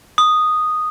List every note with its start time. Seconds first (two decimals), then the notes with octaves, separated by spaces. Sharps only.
0.18 D#6